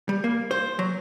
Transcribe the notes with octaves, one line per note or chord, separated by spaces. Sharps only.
G3
A#3
C5
F#3